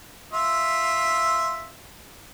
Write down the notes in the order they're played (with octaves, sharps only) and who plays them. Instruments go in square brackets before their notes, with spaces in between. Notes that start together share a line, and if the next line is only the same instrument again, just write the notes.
[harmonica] F4 E5